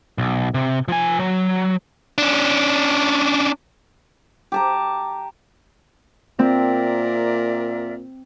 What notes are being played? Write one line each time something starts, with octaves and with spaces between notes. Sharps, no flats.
B1
C3
F3 G#5
F#3
C#4 D4
G4 A5 A#5
A#2 C4 A#4 D5 E5